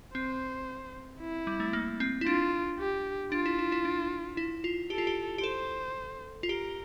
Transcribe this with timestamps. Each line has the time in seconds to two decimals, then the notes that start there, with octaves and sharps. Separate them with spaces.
0.15 C4 C5
1.20 E4
1.47 G3
1.60 A3
1.73 A#3
2.00 C4
2.21 E4
2.26 D4 F4
2.79 G4
3.32 D4 F4
3.46 E4
3.59 E4
3.72 E4
3.85 D4
4.37 E4
4.64 F4
4.90 G4 A4
4.98 F4
5.07 G4
5.38 G4
5.44 A4 C5
6.43 F4
6.49 G4 A#4